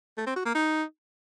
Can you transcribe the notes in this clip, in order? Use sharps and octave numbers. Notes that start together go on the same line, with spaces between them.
A3
C4
F#4
A#3
D#4